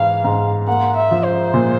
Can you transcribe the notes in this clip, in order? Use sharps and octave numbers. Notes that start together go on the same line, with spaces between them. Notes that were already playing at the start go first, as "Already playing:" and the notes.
Already playing: G#2 E3 F5
G#2
A#3 F#5
E5
F3
C5
A#2